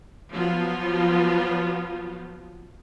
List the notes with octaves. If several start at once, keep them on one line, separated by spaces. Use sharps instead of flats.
F3 F#3 B3 F4